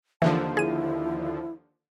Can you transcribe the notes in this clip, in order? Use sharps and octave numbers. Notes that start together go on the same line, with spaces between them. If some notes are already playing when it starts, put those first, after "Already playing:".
D#2 D3 E3 F3 A5
E4 G#4 D#7